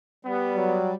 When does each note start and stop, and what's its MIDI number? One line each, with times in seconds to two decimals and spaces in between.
0.25 0.95 55
0.25 0.78 59
0.55 0.92 54